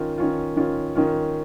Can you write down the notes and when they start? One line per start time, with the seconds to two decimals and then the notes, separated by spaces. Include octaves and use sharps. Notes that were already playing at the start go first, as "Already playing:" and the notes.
Already playing: D#3 C#4 F4
0.18 D#3 C#4 F4
0.56 D#3 C#4 F4
0.95 D#3 C#4 F4